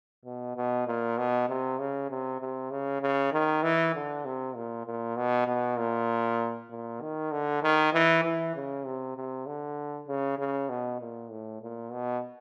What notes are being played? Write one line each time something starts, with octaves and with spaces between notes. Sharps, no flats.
B2
B2
A#2
B2
C3
C#3
C3
C3
C#3
C#3
D#3
E3
D3
C3
A#2
A#2
B2
B2
A#2
A#2
D#3
D3
D#3
E3
E3
C#3
C3
C3
D3
C#3
C#3
B2
A#2
A2
A#2
B2